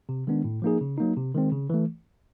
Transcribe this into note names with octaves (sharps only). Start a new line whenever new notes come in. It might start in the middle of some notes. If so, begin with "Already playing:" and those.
C3
D#3 G#3 B3 D4
A2
F3 A#3 D#4 G#4
C#3
F#3 A#3 D#4
C3
D#3 G#3 C4
C#3
E3 A3